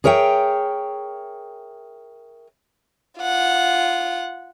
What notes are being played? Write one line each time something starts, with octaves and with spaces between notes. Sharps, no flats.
G#4 A#4 C#5 E5 G5
F4 F#5